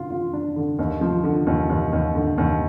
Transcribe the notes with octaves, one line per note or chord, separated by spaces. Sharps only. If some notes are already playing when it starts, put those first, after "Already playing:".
Already playing: D3 F4
F4
D4
D3
D#2
F3
D3
D#2
D#2
D#2
D3
D#2